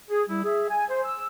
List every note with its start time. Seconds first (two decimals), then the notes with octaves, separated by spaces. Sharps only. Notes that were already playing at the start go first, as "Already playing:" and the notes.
0.10 G#4
0.28 G3 E4
0.45 G#4 E5
0.70 G#5
0.89 C5
1.05 E6